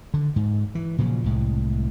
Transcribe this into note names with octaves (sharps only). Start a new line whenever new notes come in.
D3
G#2
E3
A#2 C#3 F3 F#3
C2 A2 G#3